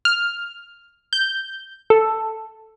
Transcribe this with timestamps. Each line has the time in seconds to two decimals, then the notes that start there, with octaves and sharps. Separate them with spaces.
0.05 F6
1.13 G6
1.90 A4